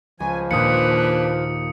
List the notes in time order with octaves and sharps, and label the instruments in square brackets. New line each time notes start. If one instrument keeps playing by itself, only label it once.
[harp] C#2 [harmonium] F3 [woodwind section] G#5
[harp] D#2 A#2 [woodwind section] A#3 D4 B4 [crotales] D#6 C#7